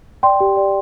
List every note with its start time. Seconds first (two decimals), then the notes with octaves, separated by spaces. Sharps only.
0.23 D5 G5 C6
0.40 G4
0.57 D5